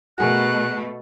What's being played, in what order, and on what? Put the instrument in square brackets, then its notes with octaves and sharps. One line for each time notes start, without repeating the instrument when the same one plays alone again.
[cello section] B2 A3 [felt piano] F#4 G#4 A#4 [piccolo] F#6